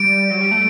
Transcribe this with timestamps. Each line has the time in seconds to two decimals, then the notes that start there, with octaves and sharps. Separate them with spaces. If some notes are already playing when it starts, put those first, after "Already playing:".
Already playing: G3 D7
0.31 F#3
0.41 G3
0.51 A3